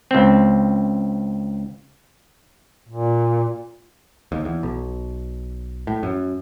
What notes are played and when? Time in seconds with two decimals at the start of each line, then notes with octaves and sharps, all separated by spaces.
0.11 C#2 C4
2.89 A#2
4.32 D#2
4.45 E2
4.63 B1
5.87 A2
6.03 F#2